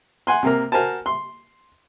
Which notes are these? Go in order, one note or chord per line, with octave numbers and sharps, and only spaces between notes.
F#5 G#5 C6
C3 A#3 A#4
F#4 A#4 C5 G#5 A5
C6